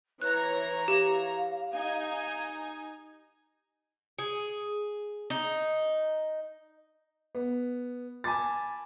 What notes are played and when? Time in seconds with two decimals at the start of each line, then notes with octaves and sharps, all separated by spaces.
0.22 E3 B4 C#5 A#5 F#6
0.88 G4 F5
1.74 D#4 G#5
4.19 G#4
5.30 D#4
7.35 B3
8.24 G#5 A5 B5 D6 A6